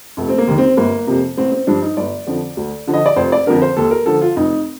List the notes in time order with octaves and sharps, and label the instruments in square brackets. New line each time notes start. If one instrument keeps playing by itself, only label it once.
[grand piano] F1 A3
C4
A#3
D#2 D#3
C4
G1 A#3
F2 C3
A1 C4
C4
G2 F3 D4
D#4
G1 D5
F2 D3 F3
D2
D3 F3
D#5
D5
F1 C5
D5
F2 D3 A#4
C5
D#2 A4
A#4
D3 F3 A4
F4
F1 D#4